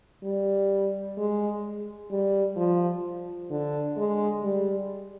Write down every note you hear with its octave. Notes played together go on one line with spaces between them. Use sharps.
G3
G#3
G3
F3
D3
G#3
G3